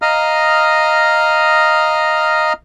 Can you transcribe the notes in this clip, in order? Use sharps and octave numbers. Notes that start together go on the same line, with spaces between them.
D#5 F5 A#5 D#6 F6